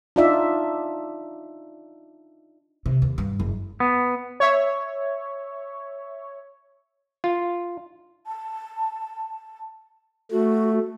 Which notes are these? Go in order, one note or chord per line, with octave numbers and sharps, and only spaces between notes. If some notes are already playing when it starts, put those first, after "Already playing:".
D4 D#4 F4 D5 E5
C3
D#2
G2
F#1
B3
C#5 E5
F4
A5
A3 F#4